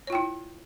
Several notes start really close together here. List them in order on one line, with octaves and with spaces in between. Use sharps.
C#5 F4 G5 E4